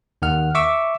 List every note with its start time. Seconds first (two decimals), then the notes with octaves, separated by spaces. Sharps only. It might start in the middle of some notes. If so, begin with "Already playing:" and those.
0.22 D#2 D#3 F#5 F6
0.55 E5 C#6 D6 E6